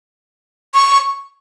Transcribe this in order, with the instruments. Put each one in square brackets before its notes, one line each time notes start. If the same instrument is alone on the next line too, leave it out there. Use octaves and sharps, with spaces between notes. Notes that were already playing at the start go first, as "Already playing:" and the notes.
[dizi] C#6